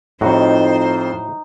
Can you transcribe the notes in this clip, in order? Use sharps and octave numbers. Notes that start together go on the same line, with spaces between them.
F2 A2 D#4 F#4 C5